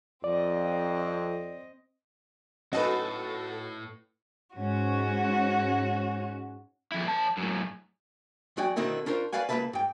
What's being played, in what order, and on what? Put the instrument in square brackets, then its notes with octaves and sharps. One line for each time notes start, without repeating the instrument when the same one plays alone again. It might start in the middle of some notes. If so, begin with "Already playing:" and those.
[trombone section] F2 [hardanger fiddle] C4 D#5 [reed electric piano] D5
[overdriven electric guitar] A2 [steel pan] C#4 B4 [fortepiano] D#4 D#5 [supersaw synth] F#4 A4
[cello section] G#2 C#4 [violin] F#4
[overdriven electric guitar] F2 E4
E3 A5
F#2 A2
[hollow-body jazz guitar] E2 F#3 F#4 D5 G5 G#5
B2 D3 D#3 C4 D#4 E4
C#4 D4 F4 A#4 C5
B4 C#5 D5 F5 F#5 G#5
C#2 F3 A#3 B4 E5 A5
G#2 G5